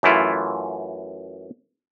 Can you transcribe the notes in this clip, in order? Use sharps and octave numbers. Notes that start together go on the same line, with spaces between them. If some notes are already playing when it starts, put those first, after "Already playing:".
F#2 E3 A3 E4 F4